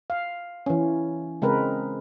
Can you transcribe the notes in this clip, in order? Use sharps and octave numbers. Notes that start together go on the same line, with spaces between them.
F5
E3 C#4
C#3 G#3 C4 A#4 B4